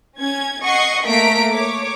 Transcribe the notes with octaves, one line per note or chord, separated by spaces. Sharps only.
C#4 G#6
D#5 F#5 C#6 C7
A3 A#3 A#5 B6 D7
C#5 D6